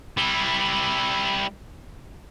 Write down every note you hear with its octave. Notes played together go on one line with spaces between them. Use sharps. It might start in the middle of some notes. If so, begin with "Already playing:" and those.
G3 E4